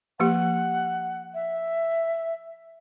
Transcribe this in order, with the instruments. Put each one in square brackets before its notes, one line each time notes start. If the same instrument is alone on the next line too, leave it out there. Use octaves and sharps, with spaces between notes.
[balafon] F3 A#3 G4 [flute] F#5
[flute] E5